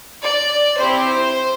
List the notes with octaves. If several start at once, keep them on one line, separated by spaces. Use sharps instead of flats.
D5
C4 E4 G4 C5